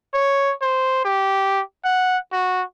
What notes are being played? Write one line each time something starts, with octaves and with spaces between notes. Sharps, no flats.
C#5
C5
G4
F#5
F#4